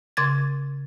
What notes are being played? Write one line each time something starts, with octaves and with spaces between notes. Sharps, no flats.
C#3 C6 G#6 A6